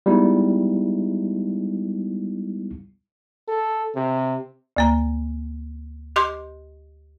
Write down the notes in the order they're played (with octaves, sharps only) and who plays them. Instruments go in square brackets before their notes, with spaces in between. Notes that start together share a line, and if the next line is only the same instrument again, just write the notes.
[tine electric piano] G3 G#3 B3 D#4 E4
[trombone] A4
C3
[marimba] D2 A#3 A#5
G4 D#5 C6 D6 G6